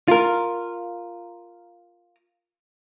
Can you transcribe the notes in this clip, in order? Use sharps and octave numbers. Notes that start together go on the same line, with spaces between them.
F4 A#4